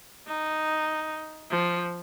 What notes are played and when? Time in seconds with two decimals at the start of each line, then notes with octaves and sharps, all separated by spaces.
0.27 D#4
1.51 F3